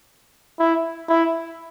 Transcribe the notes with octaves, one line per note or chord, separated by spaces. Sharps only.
E4
E4